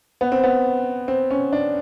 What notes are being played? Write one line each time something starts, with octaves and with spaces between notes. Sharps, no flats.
B3
C4
B3
C4
C#4
D4